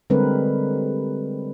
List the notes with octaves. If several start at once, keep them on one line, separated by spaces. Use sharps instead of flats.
D3 G3 G#3 C4 A#4 B4